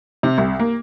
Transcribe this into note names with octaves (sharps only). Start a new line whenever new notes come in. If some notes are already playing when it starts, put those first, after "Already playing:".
C3
C2
A#3